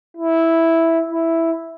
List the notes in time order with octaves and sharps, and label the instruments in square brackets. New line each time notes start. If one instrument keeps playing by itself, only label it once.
[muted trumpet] E4
E4